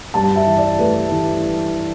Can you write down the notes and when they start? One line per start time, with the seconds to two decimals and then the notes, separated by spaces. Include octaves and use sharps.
0.14 G2 A5
0.36 E5
0.46 E3
0.57 D5
0.79 A3 B4
1.12 E3